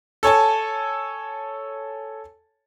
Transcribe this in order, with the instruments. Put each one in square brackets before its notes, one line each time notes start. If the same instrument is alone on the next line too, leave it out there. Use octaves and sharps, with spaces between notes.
[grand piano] A4 C#5 G#5 A5